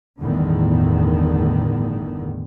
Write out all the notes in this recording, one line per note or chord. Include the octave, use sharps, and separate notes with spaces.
G1 E2 A2 D3 D#3